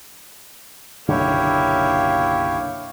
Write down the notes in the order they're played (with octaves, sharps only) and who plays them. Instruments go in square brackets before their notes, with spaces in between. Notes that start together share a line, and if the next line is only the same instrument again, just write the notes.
[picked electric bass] F#1 B1 D3 [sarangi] A#3 [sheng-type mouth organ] E4 G4 C#5